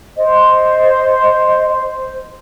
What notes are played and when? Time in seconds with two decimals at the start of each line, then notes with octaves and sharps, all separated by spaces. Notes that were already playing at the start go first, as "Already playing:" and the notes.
0.17 C5 D#5